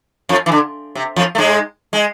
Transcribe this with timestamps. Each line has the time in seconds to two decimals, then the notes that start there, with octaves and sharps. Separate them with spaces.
0.29 F2 F3
0.46 E3
0.52 D3
0.95 C3
1.16 F2 F3
1.35 A3
1.38 G#2 G#3
1.93 G#3